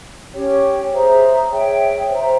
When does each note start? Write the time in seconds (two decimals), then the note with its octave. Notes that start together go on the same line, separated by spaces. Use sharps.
0.34 C#4 G4 C#5 G5
0.92 G#4 C5 E5 A#5
1.51 G#4 C#5 E5 G5
2.11 C5 E5 A#5